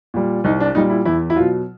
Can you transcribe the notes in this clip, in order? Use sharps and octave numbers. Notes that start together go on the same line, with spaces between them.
A#2 G3
C2 D#4
D4
A#2 G3 D#4
E4
E2 E4
E4
B2 F#3 F4